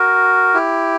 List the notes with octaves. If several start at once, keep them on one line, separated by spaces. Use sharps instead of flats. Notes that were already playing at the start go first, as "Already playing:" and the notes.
Already playing: F#4 A#4
E4 G4